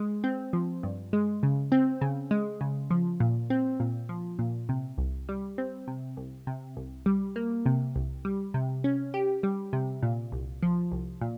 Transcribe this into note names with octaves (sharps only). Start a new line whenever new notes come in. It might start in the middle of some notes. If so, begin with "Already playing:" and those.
Already playing: G#3
C4
F3
G2
G#3
C#3
C4
C#3
G#3
C#3
F3
A#2
C4
A#2
F3
A#2
C3
C2
G3
C4
C3
C2
C3
C2
G3
A#3
C3
C2
G3
C3
C#4
G4
G3
C3
A#2
C2
F3
C2
A#2